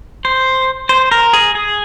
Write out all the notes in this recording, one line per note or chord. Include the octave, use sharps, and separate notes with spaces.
C5
C5
A#4
G#4
G#4